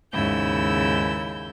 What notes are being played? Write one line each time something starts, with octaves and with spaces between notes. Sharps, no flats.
D#2 G#2 C#3 E4 E6 G6